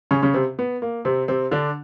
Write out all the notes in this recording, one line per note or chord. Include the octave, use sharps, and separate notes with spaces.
C#3 C#4
C#3 C#4
C3 C4
B3
A#3
C3 C4
C3 C4
D3 D4